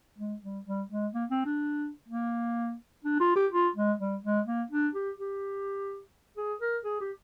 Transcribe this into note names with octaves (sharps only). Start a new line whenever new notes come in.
G#3
G3
G3
G#3
A#3
C4
D4
A#3
D4
F4
G4
F4
G#3
G3
G#3
A#3
D4
G4
G4
G#4
A#4
G#4
G4